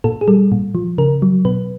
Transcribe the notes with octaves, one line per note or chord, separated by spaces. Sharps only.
A#2 A4
G#4
G3 A4
A#2
F3
C#3 A#4
F#3
B2 B4